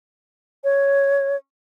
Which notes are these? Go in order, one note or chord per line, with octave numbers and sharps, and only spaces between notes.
C#5